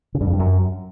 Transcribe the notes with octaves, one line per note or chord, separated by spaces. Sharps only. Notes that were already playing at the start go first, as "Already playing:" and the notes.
C#3
G2
F2
G2
F#2